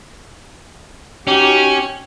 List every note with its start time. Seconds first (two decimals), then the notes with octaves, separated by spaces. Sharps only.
1.27 C#4 D#4 F#4 G4